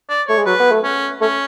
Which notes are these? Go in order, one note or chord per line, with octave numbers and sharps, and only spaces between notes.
D5
A3 C#5
G#3
F#3 B4
B3
A3
C#4
A3 C#4